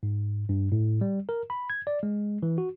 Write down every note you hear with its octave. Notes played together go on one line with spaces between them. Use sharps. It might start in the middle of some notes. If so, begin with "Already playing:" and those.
G#2
G2
A2
G3
A#4
B5
G#6
D5
G#3
E3
F#4